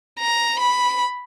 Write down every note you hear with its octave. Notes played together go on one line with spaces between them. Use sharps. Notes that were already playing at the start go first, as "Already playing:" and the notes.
A#5
B5